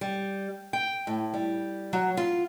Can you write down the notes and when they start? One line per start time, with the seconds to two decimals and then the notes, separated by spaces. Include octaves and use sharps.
0.01 G3
0.73 G5
1.07 A2
1.34 G3
1.93 F#3
2.17 F4